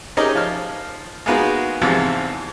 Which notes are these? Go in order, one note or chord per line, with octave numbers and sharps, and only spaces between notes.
C#4 D#4 G4 G#4 A#4 D#5
F3 F6
G#3 A#3 B3 D#4 F4 F#4
E2 G#2 C3 E3 F3